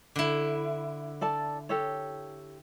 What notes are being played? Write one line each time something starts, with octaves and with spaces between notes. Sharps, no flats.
D3 E4
A4 D5 A5
G4 A4 C#5